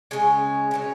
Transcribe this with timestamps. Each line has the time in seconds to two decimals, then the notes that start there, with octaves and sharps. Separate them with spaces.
0.11 C#3 G#3 C#4
0.71 B2 F#3 C#4